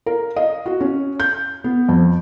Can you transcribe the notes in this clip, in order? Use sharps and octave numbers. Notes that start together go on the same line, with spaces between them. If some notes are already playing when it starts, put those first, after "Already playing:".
A#4
D#5
F#4
C#4
G6
B3
F2